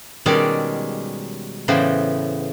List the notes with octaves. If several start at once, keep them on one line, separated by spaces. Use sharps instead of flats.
B2 D#3 G3 G#3 C#4 D5
A2 C#3 E3 B3 C5 G5